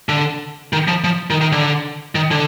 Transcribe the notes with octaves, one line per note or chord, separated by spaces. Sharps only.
D3
D#3
F3
F3
D#3
D#3
D3
D#3
D3